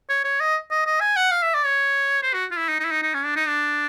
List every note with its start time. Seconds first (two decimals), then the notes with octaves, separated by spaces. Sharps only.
0.09 C#5
0.25 C#5
0.40 D#5
0.71 D#5
0.86 D#5
1.00 G#5
1.16 F#5
1.31 F5
1.42 E5
1.54 D5
1.65 C#5
2.22 C5
2.33 F#4
2.51 F4
2.57 E4
2.68 D#4
2.79 D#4
2.84 E4
2.91 D#4
3.02 D#4
3.14 C#4
3.24 D4
3.36 D#4
3.47 D4